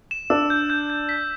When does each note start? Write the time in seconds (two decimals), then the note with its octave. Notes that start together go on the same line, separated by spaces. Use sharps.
0.11 E7
0.30 D4 E6
0.50 G6
0.70 G6
0.90 G6
1.09 B6